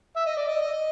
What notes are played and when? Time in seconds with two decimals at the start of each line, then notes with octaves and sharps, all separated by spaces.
0.16 E5
0.26 D#5
0.37 D5
0.48 D#5
0.61 D#5